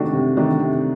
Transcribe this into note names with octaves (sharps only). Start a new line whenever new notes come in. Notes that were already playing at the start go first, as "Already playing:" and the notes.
Already playing: C3 D#3 A3 D4 F#4
C3
D#3 A3 D4 F#4
C3